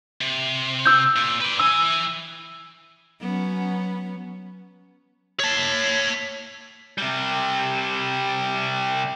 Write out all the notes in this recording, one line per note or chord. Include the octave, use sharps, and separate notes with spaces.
C3
E6 G6
A#2
B4 D5
E3 G#5 E6
F#3 B3 C#4
C#5 A5
C3 G3